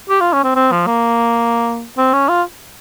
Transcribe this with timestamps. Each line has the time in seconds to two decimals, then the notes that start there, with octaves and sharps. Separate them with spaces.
0.09 G4
0.21 F4
0.33 C#4
0.44 C4
0.55 C4
0.72 F3
0.87 A#3
1.97 C4
2.13 C#4
2.28 F4